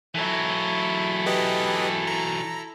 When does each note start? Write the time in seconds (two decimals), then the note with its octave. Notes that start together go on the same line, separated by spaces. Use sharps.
0.15 E3 F#3 E4 A4
1.26 G4 B4 D#5
2.07 A#5